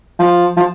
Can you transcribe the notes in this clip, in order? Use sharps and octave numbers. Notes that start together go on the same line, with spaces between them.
F3
F3